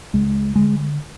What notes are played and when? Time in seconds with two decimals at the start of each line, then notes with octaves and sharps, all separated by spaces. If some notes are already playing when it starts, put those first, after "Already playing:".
0.13 C#2 C#3 G#3
0.55 D3 G#3